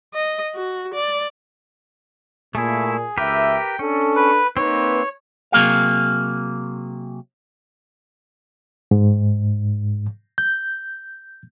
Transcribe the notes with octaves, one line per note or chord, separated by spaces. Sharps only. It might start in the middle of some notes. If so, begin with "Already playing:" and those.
D#5
F#4
D5
A#2 A3 E4 G#4
C#2 G4 A#4 B4 E5 G5
C#4 D4 A4
B4
A#3 C4 D#4 B4 C#5
C3 F#3 A#3 G#4 F5
G#2
G6